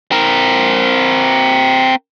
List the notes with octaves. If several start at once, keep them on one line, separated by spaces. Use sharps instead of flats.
C4 A#4